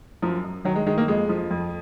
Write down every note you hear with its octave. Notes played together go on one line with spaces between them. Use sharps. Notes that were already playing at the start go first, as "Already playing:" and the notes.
F#2 F3
F#2
D#3 F#3
G#3
D#3 G#3
A#3
F2 G#3
F3
F2